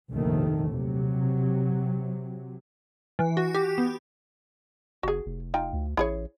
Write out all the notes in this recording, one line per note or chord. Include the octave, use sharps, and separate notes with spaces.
F1 A#1 D#2 D#3 A3
C3 F#3
E3
F#4
G4
B3
F#1 F#4 G#4
F1
D#4 F4 G5
D2
A1 E4 G#4 C#5